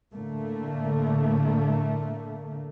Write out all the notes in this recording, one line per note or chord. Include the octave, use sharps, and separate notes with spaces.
A2 D3 A3 A#3